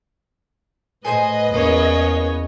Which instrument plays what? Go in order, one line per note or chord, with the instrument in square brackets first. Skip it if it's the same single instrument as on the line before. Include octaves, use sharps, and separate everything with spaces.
[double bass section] A2 [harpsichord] G#4 C5 G#5 [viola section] B4 D#5
[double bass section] E2 [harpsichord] A#3 [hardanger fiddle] C#4 C#5